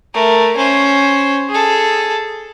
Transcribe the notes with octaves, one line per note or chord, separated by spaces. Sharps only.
A3 A#4
C#4 C5
G#4 A4